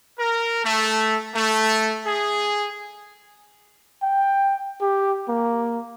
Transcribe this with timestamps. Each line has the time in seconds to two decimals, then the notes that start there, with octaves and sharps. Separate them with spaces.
0.19 A#4
0.65 A3
1.35 A3
2.06 G#4
4.03 G5
4.81 G4
5.29 A#3